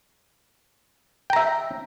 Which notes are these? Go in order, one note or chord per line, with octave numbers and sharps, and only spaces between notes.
E5 G5 A#5